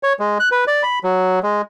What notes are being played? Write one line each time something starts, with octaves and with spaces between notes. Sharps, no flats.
C#5
G#3
F#6
B4
D5
B5
F#3
G#3